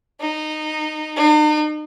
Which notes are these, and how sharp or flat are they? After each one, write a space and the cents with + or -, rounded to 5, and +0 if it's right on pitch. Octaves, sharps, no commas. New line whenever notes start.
D#4 -15
D#4 -45